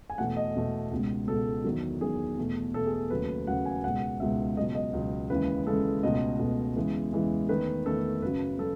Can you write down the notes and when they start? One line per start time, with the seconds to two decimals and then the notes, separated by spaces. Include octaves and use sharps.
0.10 G#5
0.18 E2 B2 A3 F#5
0.37 D#5
0.55 E2 B2 A3
0.91 C#2 B2 G#3
1.28 C#2 B2 G#3 A4
1.64 E2 D#3 F#3
2.01 E2 D#3 F#3 G#4
2.37 E2 B2 A3
2.74 E2 B2 A3 A4
2.86 G#4
2.93 A4
3.10 D#2 C#3 F#3 A3 B4
3.47 D#2 C#3 F#3 A3 F#5
3.66 G#5
3.84 C#2 B2 G#3 F#5
4.20 C#2 B2 G#3 E5
4.57 C#2 B2 F#3 D#5
4.75 D#5
4.93 C#2 B2 F#3
5.30 D#2 C#3 E3 G#3 B4
5.67 D#2 C#3 E3 G#3 A4
6.03 C#2 B2 A3 D#5
6.39 C#2 B2 A3
6.76 E2 C#3 E3 G#3
7.13 E2 C#3 E3 G#3
7.49 E2 D#3 A3 B4
7.86 E2 D#3 A3 A4
8.22 F#2 C#3 F#3 B4
8.59 F#3 A4